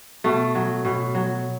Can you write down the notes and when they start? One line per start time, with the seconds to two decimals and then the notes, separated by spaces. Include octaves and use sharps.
0.24 B2 A3
0.55 F#3
0.85 B2
1.15 F#3